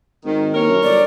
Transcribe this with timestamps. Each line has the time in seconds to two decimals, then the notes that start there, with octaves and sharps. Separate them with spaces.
0.24 G#1 D#3
0.55 D#2 E3 A#4 C#5
0.69 F#2
0.83 G1 D5